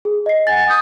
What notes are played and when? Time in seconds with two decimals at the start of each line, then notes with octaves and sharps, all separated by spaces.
0.05 G#4
0.26 D#5 C7
0.47 F#5 G#5 A6
0.68 D#6 G6